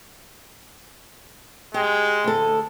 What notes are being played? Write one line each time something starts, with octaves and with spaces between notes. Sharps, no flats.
G#3 G4
D2 A4